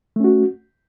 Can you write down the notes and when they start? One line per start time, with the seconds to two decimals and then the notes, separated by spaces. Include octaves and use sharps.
0.16 A3
0.20 C#4
0.24 F#4